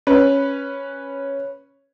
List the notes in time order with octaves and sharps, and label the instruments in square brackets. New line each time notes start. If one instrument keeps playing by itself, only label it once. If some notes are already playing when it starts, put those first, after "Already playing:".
[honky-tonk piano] C#4 B4